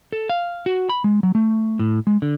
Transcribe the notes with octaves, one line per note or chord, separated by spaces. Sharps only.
A4
F5
F#4
B5
G#3
F#3
A3
A2
G#3
D3